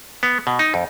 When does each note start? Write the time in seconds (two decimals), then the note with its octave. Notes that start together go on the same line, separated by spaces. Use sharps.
0.23 B3
0.47 B2
0.59 D#4
0.74 F2